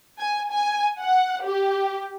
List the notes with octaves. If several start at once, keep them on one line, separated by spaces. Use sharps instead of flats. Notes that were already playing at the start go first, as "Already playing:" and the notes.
G#5
G#5
F#5
G4